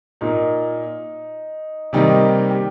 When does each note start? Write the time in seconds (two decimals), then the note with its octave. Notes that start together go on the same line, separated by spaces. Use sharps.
0.21 A#2 A#3 D#4
1.93 C3 D#3 G3 A#3 D#4
2.51 G4